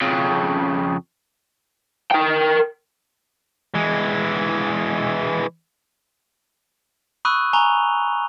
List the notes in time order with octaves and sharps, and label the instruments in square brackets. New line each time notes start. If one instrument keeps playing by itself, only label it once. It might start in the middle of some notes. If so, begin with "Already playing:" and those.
[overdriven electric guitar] F2 C#3
A#4 G5
[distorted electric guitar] E3 G#3
[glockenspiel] B5 C#6 D#6 E6 F#6 D#7
G#5 A#5 C#6 F7 G7